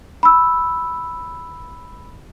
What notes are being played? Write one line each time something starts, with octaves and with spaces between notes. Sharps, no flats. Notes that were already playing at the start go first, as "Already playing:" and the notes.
B5 E6